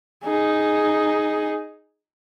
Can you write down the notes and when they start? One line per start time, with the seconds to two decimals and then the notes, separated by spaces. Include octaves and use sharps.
0.24 D#4 G#4